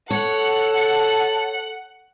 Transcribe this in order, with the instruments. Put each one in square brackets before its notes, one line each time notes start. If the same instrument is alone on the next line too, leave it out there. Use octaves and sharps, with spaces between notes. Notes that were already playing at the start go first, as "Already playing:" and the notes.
[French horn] A4 [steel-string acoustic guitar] C#5 [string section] F#5 [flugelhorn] A5